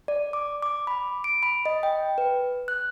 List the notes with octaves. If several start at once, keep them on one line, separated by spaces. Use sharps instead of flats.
D5
D6
D6
B5
D7
B5
D#5
G5
B4
F#6